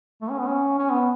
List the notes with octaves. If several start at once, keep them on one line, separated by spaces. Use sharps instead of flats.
A3
C#4
B3
C#4
C#4
B3